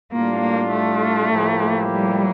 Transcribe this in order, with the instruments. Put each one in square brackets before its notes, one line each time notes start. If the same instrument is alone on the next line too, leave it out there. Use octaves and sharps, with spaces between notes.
[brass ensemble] A2 G3 D4 F4 [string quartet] A#3
[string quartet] A#3
A3
[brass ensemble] A2 F3 A#3 E4 G4
[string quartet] G3